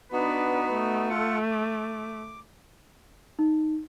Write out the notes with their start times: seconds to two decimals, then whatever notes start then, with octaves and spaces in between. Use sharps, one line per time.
0.13 B3 D4 D#4 F#4 B4
0.72 A3
1.10 F4 A4 F#5
1.51 D6
3.39 D#4